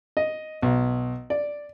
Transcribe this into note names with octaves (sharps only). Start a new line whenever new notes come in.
D#5
B1
D5